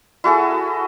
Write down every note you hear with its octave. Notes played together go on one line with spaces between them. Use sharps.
E4 F#4 G#4 A4